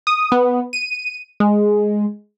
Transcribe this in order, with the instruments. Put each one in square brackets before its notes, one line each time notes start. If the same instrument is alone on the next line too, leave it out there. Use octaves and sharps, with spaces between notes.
[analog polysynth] D#6
B3
D#7
G#3